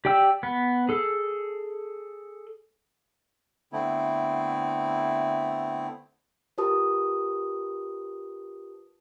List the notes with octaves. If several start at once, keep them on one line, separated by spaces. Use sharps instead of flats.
G4 D5 G5 E6
B3
G#4 A4
D3 A3 B3 C4 E4
F4 G4 A#4 B4 A5 D#6